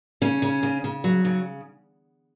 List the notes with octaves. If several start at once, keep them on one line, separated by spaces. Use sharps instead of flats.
C#3 C#4
C#3
C#3
C#3
F#3
C#3